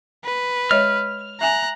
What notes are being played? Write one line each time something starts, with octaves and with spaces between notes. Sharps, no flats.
B4
G#3 C#5 D#5 F6
E5 G#5 A#5 F#6